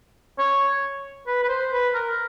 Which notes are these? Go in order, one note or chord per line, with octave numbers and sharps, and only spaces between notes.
C#5
B4
B4
C5
B4
A#4